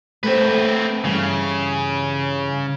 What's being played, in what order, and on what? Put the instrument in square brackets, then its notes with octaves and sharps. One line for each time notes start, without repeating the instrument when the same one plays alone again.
[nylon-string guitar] A3 C5 [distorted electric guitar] C4 B4
[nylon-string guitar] G2 E3 [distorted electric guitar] C#3